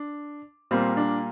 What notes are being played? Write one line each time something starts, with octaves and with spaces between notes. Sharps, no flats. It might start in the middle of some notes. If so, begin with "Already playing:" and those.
Already playing: D4
A#2 G3 A#3 C4
D4